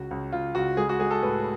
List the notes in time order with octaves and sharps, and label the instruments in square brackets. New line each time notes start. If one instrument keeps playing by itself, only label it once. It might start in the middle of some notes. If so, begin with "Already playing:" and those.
Already playing: [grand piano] C#2 F#4
C#2
C#2 F4
C#2 F#4
G#3 G#4
F#4
G#3 G#4
A4
A2 B4